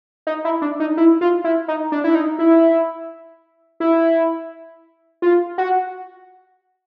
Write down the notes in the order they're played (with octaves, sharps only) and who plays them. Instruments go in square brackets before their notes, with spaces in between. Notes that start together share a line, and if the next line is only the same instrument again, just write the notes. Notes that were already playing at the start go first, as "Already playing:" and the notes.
[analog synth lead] D#4
E4
D4
D#4
E4
F4
E4
D#4
D4
E4
D#4
E4
E4
F4
F#4